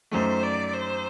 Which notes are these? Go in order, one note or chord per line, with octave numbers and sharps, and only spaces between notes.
F#2 D#3 A3 C5
D5
C5